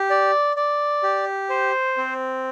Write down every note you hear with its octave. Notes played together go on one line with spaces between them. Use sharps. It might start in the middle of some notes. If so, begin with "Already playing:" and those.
Already playing: G4
D5
D5
G4
C5
C4